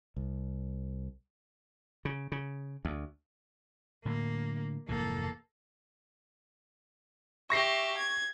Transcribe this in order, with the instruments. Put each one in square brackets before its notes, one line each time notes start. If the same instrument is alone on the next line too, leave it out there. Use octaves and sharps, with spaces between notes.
[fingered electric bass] C2
[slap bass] C#3
C#3
D2
[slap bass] A2 D3 F#3 [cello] A#3
[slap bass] F1 G#2 E3 [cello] A#3 A4
[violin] G4 E5 [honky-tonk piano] C#6 A#6 C7
[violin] G#6